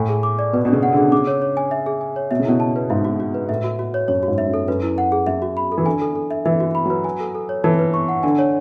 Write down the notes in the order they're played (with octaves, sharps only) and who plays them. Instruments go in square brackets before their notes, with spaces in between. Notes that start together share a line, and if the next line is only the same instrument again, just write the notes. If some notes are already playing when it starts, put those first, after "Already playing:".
Already playing: [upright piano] A2 [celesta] G#5
[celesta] G#4
D6
D5
[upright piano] B2 [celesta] B4
[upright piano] B2
[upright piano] C#3 [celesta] D4
[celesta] F#5
[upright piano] D3 [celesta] G#4
[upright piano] C#3 [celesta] D6
[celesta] C#5
C#5
G#5
E5
G#4
G#5
C#5
[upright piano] B2 [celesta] E5
[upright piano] C#3
[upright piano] B2 [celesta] E4
[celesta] A5
B4
[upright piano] G#2 [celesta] E5
[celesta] F#4
F#4
B4
[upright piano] A2 [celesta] E5
[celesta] F#4
F#4
C#5
[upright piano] F#2 [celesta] C#5
[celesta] F#4
[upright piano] G#2
[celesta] E5
[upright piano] F#2
[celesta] A4
[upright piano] F#2 [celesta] B4
[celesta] E4
F#5
G#4
[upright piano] F#2 [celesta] E5
[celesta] F#4
B5
A4
[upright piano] E3
[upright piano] D3 [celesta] G#5
[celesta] A4
A4
E5
[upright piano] E3 [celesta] E5
[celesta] F#4
B5
[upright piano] F#3 [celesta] B4
[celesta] G#5
A4
A4
C#5
[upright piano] E3 [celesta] A5
[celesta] B4
C#6
F#5
[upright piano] D3 [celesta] G#5
[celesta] C#5